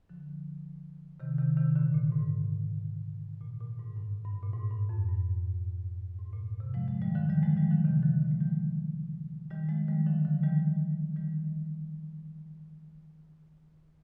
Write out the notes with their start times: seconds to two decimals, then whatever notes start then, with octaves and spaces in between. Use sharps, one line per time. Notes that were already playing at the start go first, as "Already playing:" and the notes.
0.09 D3 F3
1.20 C3 D#3
1.38 C3 D#3
1.57 C3 D#3
1.76 A#2 D3
1.94 A#2
2.12 G#2
3.41 A#2
3.60 A#2
3.79 G#2
3.97 G2
4.25 G2
4.43 A#2
4.53 G#2
4.71 G2
4.89 F2
5.08 G2
6.18 G#2
6.33 A#2
6.60 C3
6.74 F3 G#3
6.88 F3 G#3
7.02 D#3 G3
7.15 D3 F3
7.29 D#3 G3
7.43 F3 G#3
7.56 D#3 G3
7.71 D3 F3
7.84 C3 D#3
8.03 D3 F3
8.21 D3 F3
8.31 G#3
8.40 D#3 G3
9.51 D#3 G3
9.69 F3 G#3
9.88 D#3 G3
10.06 D3 F3
10.25 D3 F3
10.43 D#3 G3
11.16 D#3 G3